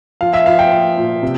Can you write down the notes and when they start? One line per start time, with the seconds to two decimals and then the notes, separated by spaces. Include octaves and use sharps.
0.21 F3 F5
0.33 E5
0.46 F3 F5
0.59 G5
0.72 F3
0.97 A#2
1.23 C3